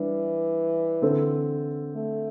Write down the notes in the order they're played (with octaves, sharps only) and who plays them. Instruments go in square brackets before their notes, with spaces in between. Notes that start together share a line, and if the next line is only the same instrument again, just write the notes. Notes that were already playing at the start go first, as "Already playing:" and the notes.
Already playing: [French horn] E3 [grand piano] G3 D4
[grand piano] D3 C4 A4 C5
[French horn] A3